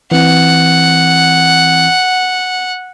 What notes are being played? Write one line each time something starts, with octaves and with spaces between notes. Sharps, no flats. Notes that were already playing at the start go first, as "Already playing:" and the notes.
E3 C4 F#5